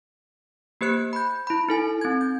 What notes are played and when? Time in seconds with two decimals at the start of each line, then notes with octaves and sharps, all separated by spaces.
0.81 A#3 G4 C5 F#6 C#7
1.13 B5 G6
1.47 E4 B5
1.69 D#4 A4 G#5
2.01 C4 G#6
2.21 G6